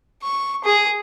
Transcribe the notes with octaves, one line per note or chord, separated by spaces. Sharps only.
C#6
G#4